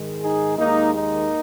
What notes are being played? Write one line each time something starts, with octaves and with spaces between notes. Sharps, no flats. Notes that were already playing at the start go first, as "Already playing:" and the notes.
Already playing: G#2 D#3 G#3
D#4 G#4
D#2 D#3 G#3 A#3 D#4
A#3 D#4